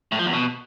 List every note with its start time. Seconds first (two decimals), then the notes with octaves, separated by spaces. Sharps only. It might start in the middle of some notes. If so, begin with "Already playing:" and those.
0.12 A2
0.19 F3
0.26 E2
0.33 B2